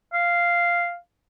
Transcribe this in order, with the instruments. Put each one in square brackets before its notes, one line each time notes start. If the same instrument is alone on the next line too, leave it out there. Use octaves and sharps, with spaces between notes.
[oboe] F5